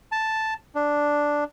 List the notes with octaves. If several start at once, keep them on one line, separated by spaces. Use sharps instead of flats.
A5
D4